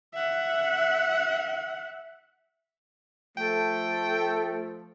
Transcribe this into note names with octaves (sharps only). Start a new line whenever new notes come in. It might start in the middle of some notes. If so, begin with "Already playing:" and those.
E5 F#5
F3 A3 A4 G5